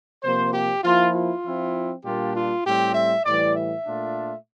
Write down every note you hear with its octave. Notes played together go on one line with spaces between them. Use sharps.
C3 F3 A#3 C5
G4
F3 A#3 E4 F4
F4
F3 C4 E4
A#2 G3 A#3 D4 F4 G4
F4
A2 G3 C4 G4
E5
A2 E3 G3 D5
E5
A#2 A3 D4 F4